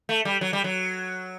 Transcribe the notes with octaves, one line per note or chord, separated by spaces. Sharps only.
A3
G3
F#3
G3
F#3